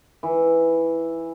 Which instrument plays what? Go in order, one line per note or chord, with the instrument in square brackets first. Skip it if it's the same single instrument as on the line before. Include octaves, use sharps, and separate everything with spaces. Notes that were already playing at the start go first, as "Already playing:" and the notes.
[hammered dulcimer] E3